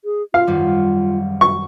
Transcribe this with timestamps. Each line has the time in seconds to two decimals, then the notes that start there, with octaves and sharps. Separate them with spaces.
0.05 G#4
0.34 F4 F5
0.47 G#1 F#2 G3
1.41 C#6